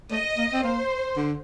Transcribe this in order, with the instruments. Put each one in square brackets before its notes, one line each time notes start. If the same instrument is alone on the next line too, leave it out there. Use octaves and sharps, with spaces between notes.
[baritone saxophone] A3 [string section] D#5
[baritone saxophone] A#3
C4
[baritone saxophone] A#3 [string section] C5
[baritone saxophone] D3